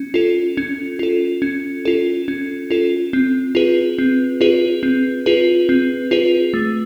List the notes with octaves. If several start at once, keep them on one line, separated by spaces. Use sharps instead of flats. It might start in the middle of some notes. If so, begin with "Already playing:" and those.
Already playing: C#4
F4 A4
C#4
F4 A4
C#4
F4 A4
C#4
F4 A4
C4
F4 G#4 B4
C4
F4 G#4 B4
C4
F4 G#4 B4
C4
F4 G#4 B4
A3